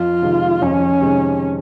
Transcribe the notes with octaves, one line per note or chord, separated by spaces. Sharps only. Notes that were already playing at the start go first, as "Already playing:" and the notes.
Already playing: F2 F4
C3 D#3 G#3
F2 C#4
C3 D#3 G#3